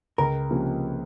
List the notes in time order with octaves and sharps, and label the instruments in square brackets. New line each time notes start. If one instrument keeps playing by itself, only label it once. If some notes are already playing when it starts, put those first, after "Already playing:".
[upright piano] C#2 [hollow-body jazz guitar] A#4
[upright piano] C3 F3 A#3 C#4